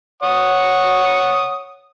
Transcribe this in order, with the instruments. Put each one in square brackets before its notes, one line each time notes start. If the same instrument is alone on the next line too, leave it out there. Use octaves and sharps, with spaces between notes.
[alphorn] C#5 [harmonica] F#5 C#6 D#6